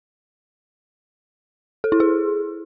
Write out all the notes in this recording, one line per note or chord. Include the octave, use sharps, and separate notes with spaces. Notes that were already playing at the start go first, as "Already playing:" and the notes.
A4
E4
G#4